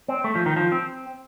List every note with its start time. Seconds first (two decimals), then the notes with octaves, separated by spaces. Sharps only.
0.08 C4
0.24 A3
0.35 F3
0.46 D#3
0.56 F3
0.72 C4